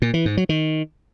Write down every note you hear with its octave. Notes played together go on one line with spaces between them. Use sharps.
A#2
E3
G#2
F#3
D#3